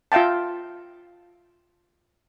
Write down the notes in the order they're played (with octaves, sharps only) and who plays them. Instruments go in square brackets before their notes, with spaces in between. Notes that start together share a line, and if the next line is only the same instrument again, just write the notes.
[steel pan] F4 E5 F5 G5 A5